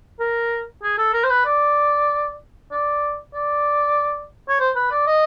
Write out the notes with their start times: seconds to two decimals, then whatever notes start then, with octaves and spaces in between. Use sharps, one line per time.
0.20 A#4
0.83 G#4
0.98 A4
1.14 A#4
1.24 C5
1.30 B4
1.46 D5
2.72 D5
3.34 D5
4.49 C#5
4.60 C5
4.76 B4
4.91 D5
5.07 D#5